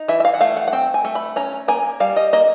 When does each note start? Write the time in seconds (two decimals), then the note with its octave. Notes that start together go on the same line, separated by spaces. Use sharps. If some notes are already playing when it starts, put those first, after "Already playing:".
Already playing: D#4
0.08 E3 E5
0.20 E5
0.25 F5
0.34 F#5
0.41 A3 F5
0.57 F#5
0.68 F#5
0.73 C4 G5
0.94 G#5
1.05 A3
1.15 B5
1.36 C#4 A#5
1.68 A#3 G#5
2.00 G3 F5
2.16 D#5
2.33 A#3 D#5